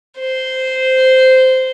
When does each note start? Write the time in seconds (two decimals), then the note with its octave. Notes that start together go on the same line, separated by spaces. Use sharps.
0.19 C5